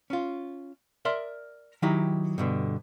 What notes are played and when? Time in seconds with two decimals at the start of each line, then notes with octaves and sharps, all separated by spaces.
0.10 C#4 F4
1.05 A#4 D5 E5 C6
1.82 D#3 F#3 D#4 E4 G4
2.38 G2 B2 D3